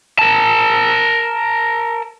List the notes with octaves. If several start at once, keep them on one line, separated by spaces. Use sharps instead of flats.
A#4 A5